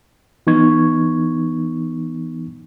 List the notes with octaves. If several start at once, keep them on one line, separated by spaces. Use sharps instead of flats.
E3 B3 D#4 C#6 G#6